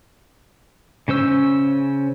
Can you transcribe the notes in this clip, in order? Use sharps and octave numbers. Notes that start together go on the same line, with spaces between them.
C#3 C#4 C5 E6